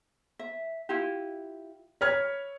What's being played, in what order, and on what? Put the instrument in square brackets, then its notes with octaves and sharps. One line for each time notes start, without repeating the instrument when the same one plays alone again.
[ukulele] E5
E4 F4 G4
[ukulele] B4 [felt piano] C#5 F6 G#6